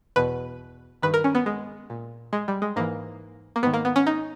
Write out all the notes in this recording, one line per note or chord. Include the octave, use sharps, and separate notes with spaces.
E2 B2 B4
G2 D#3 B4
A#4
C#4
B3
G#3
A#2
G#3
G3
G#3
G#2 E3 A#3
A#3
G#2 D#3 B3
A#3
B3
C#4
D#4